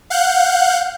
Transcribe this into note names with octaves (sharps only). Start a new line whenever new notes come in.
F5 F#5 F#6 G6